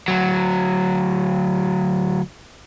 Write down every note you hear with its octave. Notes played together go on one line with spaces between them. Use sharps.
D2 F#3